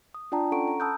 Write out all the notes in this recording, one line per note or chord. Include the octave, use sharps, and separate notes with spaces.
D#6
D4 F4 D5 G5 A5 A#5
C#4 A4 F#5 A#5 C#6 D7
A#5
A5 B5 D#6 E6 F#6 G6